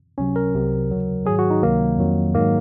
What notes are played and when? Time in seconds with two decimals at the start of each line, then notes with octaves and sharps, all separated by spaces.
0.18 C#2 C3 F#3 C#4
0.36 A#4
0.54 C2 C3 F#3
0.90 D#2 C#3 F#3
1.26 G#2 D#3 F#3 G#4
1.39 F#4
1.50 D#4
1.63 C#2 C3 D#3 F#3 A#3
1.98 F2 D#3 F#3
2.35 G#2 D#3 F#3 A#3